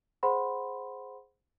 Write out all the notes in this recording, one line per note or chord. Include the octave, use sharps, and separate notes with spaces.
G#4 C5 F#5 B5 C6